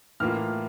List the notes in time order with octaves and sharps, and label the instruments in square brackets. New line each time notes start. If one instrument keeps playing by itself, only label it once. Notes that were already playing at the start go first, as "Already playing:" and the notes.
[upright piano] A2 E3 A#3 F4 F6